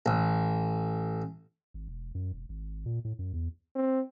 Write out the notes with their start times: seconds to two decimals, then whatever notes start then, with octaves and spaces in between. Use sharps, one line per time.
0.06 A1
1.74 G#1
1.88 E1
2.15 F#2
2.33 E1
2.49 G#1
2.86 A#2
3.05 A2
3.19 F#2
3.33 E2
3.76 C4